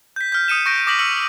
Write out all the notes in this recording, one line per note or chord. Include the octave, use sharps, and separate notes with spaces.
G6 B6
F6 G6
D#6 C#7 D#7 E7
C#6 G6 A#6 D7
D6 D#6 A#6 B6 F#7
E6 F6 C#7 D#7 F#7